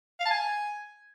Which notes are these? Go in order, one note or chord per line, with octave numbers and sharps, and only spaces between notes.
F5
A5
G#5